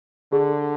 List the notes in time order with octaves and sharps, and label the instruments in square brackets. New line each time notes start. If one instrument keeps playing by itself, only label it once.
[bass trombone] D3 [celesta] G#4